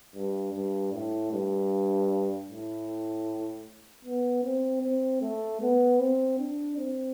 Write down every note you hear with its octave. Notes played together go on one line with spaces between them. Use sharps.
G2
G2
A2
G2
A2
B3
C4
C4
A3
B3
C4
D4
C4